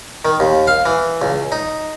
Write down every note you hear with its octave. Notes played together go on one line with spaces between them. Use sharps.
D#3
D#2
F5
E3
C#2
D#4